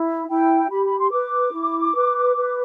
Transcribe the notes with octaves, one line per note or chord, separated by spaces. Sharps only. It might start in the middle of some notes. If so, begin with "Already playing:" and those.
Already playing: E4
E4 G5
G4 B5
B5
C6
B4 D6
E4
B4
B4